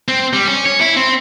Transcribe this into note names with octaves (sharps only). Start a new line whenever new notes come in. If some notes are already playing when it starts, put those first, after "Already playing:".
C4
G3
C#4
C#5
E4
C4